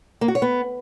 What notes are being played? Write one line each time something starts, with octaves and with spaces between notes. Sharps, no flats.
A#3
F#4
C#5
B3